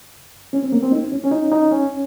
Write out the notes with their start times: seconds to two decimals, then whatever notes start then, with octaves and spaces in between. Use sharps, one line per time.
0.53 C#4
0.63 C4
0.72 A#3
0.83 C4
0.92 D#4
1.12 C#4
1.24 C#4
1.31 D#4
1.52 D#4
1.72 C#4